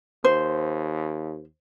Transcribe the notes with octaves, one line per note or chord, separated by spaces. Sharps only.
D#2 C5